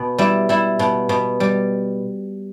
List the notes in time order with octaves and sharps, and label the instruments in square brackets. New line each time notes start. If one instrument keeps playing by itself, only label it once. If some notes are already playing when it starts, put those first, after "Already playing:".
Already playing: [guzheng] B2
G3 E4
G3 E4
B2
B2
G3